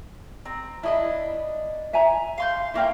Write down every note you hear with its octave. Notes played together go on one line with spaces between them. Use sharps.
C4 A#5
D4 E4 D#5 B5
E5 G#5 A#5
F5 C6 G6
A3 A#3 E4 F5 G5